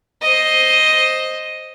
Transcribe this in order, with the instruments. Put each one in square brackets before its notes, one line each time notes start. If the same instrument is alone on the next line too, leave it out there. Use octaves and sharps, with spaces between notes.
[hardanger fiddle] C5 D#5